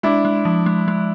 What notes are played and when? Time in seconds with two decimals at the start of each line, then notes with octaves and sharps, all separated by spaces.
0.03 G#3 D4 E4
0.25 G#3
0.45 F3
0.66 G#3
0.88 G#3